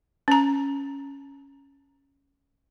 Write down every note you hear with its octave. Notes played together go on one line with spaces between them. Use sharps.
C#4 A#5